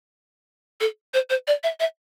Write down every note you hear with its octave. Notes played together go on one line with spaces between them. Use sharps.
A4
C5
C5
D5
E5
E5